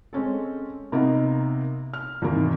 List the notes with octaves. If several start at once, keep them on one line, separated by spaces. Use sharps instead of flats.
G#3 C4 C#4 A4
C3 A#3 B3 D#4
F6
E2 G#2 C3 D#3 A#3